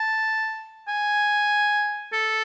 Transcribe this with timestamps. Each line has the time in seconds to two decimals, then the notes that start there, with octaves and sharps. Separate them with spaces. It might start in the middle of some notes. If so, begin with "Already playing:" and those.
Already playing: A5
0.88 G#5
2.13 A4